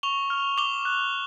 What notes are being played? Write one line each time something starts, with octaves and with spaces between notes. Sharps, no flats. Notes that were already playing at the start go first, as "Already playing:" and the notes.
C#6 F7 G7
F6
D6 F7 G7
F#6